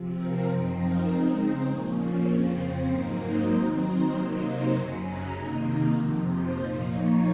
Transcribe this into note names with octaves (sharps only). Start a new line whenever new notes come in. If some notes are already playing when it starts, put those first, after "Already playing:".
Already playing: C3 F3 C4
A#4
F#2 F3 C4 D#4 C5
A#4
C#3 G#3 C4 D#4 C5
C5
A#2 F3 A#3 C#4
F2 C#3 F3 C4 C#5
C5
G#2 F#3 A#3 D#4 A#4
C5
D#3 F#3 C4 D#4 C5
C5
C3 F#3 A#3 D#4 C5
C5
F#2 C#3 F#3 C#4
A#5
C3 D#3 A#3 D#4
F2 C3 F3 F#5
C5
A#2 F3 A#3 D#4 C5
C#5